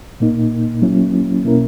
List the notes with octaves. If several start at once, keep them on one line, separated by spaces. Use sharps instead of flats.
A#2 A#3 D#4
F#3 A#3 C#4 E4
B2 A#3 C#4 E4 A#4